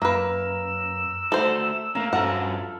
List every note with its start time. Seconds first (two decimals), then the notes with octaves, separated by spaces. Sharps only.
0.02 F#2 A#3 A#4 B4 E6
1.32 A3 F#4 A4 C5
1.95 A3 A#3 C#4 A#4 F5
2.13 G2 F3 C#4 F#4 A4 A#4 F#5